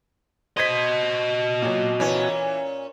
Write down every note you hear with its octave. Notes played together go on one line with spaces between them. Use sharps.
F#4 C5 D#5 G#6 B6
A#2 F#3
A#2 E3 C#4